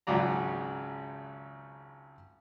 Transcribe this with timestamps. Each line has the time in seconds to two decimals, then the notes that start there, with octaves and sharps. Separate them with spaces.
0.07 G#1 C#2 C#3 F#3 D5 A#5